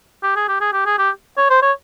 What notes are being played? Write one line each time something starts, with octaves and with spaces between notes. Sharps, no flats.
G4
G#4
G4
G#4
G4
G#4
G4
C#5
C5
C#5